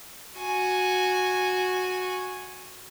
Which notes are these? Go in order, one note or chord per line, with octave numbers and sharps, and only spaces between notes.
F#4 G#5